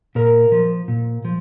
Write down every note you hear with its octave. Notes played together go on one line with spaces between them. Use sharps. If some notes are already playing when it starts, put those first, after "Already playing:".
A#2 A#4
F3
A#2
F3